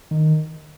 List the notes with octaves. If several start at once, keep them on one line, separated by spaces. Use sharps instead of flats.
D#3